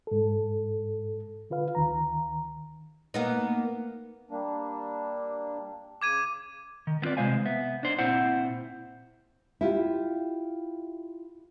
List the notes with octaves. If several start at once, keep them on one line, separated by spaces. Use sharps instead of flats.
G#2 A4
D3 F4 B4 F5
D2 D#3 A#5
A#3 B3 D#4
G3 A#3 D4
C#3 D6 G#6 D#7
D#3
B3 C4 F4 B4 D5
C3 E3 G#3 C5 F5 G#5
B3 E5
D4 D#4 C5
A#2 C4 E4 C5 F#5
E4 F4 G4